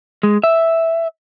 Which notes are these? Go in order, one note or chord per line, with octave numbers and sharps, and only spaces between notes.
G#3
E5